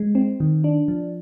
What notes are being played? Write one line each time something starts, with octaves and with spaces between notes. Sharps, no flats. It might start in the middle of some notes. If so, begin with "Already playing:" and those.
Already playing: G#3
C4
D#3
D4
F3